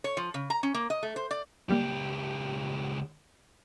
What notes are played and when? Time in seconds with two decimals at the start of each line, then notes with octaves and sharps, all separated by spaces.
0.04 C#5
0.17 F3
0.34 C#3
0.50 A#5
0.63 C#4
0.74 A#3
0.90 D#5
1.03 A3
1.16 C5
1.31 D5
1.69 C#2 F#3 G3 A#3 G4